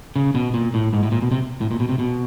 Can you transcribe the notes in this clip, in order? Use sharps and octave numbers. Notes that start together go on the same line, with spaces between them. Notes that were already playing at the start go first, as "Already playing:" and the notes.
C#3
B2
A#2
A2
G#2
A2
A#2
B2
C3
A2
A#2
B2
C3
B2